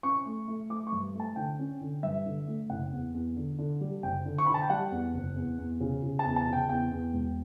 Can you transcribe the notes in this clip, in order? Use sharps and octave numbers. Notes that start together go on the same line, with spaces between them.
C#4 C#6
A3
A3
A3 D6
C#6
G2
A3
A5
D3 G5
C#4
D3
G2 E5
D3
A3
F#1 F#5
E2
E2
D3
D3
G3
F#1 G5
D3
C#6
D3 B5
A5
G5
G3 F#5
E2
F#1
E2
E2
C#3
C#3
A5
E2
A5
C#3
G5
E2 G5
E2
E1